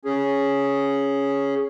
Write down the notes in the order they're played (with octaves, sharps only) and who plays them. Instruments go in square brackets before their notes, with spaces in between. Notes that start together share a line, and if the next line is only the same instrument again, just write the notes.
[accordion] C#4 G#4